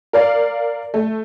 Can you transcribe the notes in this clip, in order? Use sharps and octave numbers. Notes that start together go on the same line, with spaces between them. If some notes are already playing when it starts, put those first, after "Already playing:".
A#4 D5 F5
A3